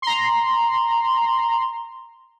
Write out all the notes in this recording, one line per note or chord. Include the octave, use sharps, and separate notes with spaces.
A#5 C6